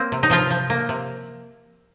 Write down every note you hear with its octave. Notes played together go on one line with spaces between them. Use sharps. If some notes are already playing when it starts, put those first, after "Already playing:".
Already playing: A#3 C4
C3
D#4
C3 F3 F4
F3
A#3
C3